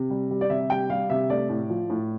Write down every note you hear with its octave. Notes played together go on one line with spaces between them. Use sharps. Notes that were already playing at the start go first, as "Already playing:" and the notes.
Already playing: C3
G3
G3
D5
C3 E5
G3 G5
G3 F5
C3 E5
A3 D5
A2
F3
A2